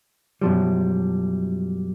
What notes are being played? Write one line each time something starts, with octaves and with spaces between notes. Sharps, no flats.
F#2 B2 F3 G3